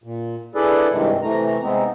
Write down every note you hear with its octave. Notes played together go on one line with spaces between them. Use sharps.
A#2
D4 E4 G#4 A4 B4 D5
G2 C3 D#3 E3 G#3
C3 E3 A3 A#5
C3 G#3 B3 C4 D#4